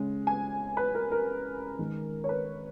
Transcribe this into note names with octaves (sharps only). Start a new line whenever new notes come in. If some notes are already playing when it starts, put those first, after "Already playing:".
Already playing: C#3 G#3
G#5
B4
A#4
A#4
D#3 G#3
C#5
B4